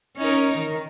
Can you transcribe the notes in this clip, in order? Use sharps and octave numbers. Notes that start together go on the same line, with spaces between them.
C#4 D#4 A#4
D#3